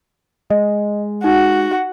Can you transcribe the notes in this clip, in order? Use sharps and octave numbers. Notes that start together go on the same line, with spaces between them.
G#3 D#5
D#4 F#4